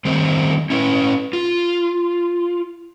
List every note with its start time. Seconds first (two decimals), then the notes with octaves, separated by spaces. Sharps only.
0.05 D#3 G3 C4 C5
0.70 C#4 E4 B4
1.33 F4